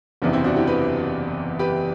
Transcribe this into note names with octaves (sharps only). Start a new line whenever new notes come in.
F#1 E2 C3 E3 B3 D4
C4 E4
D4 F#4
E4 G4
G4 B4
G4 B4